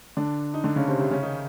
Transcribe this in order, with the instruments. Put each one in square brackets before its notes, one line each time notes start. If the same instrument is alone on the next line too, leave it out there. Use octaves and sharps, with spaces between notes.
[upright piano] D3 D4
D#4
D3 D4
C#3 C#4
C3 C4
C3 C4
C#3 C#4
D#3 D#4